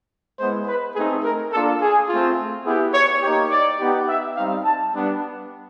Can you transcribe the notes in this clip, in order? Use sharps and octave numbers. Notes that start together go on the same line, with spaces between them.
G#3 B3 E4 C5
B4
A3 C4 D#4 G#4
A#4
A#3 D4 F4 A4
G#4
A3 C4 F4
B3 E4 G4 G#4
C#5
A#3 D#4 G4 C#5
D5
B3 D#4 G4
E5
G3 C4 D#4 F5
A5
G3 B3 D4